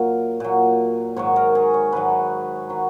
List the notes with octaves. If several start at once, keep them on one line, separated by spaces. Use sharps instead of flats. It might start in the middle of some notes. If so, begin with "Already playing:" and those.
Already playing: A#2 F#3 A#4
A#2 F#3
G#2 D#3 F#3 C#5
A#4
G#4
C#5
G#2 D#3 F#3 B4
D#3 F#3